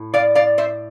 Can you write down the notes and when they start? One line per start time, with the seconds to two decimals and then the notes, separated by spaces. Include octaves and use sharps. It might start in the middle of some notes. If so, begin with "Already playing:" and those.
Already playing: A2
0.14 D5 F5
0.35 D5 F5
0.58 C5 E5